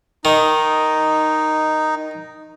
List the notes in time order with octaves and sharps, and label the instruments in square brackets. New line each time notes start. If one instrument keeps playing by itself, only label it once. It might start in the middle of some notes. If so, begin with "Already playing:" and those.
[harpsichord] D#3 [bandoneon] D#4